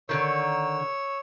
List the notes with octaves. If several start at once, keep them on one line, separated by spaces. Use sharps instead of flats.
D3 D#3 C#5 E6